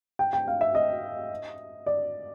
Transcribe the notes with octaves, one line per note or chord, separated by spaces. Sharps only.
G5
G5
F5
E5
D#5
D5